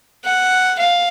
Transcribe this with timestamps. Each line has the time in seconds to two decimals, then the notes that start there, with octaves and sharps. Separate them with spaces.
0.25 F#5
0.79 F5